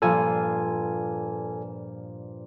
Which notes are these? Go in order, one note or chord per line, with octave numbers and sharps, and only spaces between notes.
G2 A#2 F3 A4 G#5